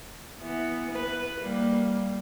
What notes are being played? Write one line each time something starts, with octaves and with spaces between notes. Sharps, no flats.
E3 B3
B4
G3 A#3